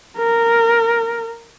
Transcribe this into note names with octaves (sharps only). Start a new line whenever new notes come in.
A#4